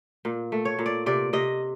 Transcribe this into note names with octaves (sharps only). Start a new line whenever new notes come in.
A#2
A3
C#5
A#2
D5
C3 D5
C3 D#5